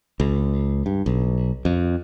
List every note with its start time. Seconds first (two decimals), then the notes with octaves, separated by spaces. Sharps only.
0.20 C#2
0.86 G2
1.06 B1
1.65 F2